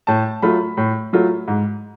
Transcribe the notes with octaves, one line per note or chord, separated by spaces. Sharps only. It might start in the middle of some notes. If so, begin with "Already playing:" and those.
A2 A5
F#3 A3 F4 B5
A2
F#3 A3 F4
G#2